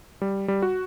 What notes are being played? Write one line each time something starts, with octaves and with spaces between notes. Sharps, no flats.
G3
G3
F#4